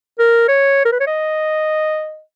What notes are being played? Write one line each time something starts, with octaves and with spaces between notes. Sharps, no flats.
A#4
C#5
A#4
B4
C#5
D#5